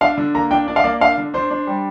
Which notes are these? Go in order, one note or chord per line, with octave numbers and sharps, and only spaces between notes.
D4 F5
D3
A#3 A#5
D4 G5
D4 D5
F5
A#3 D5
D4 F5
D3
D4 C5
D4
G3